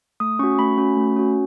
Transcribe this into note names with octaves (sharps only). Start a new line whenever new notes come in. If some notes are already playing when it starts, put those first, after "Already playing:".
A3 D#6
C#4 F#4 C#6
A3 B5
C#4 F#4
A3
C#4 F#4